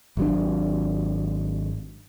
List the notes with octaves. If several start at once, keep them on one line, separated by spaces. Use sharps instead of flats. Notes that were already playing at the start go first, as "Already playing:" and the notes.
G#1 F#3 D4